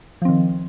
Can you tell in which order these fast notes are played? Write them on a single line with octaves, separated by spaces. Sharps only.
F3 C4 D#3